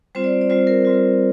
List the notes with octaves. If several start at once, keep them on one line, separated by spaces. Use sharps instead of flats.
G3 C4 F4 C5
D5
D5
G3 C4 F4 C5
A#4
G3 C4 F4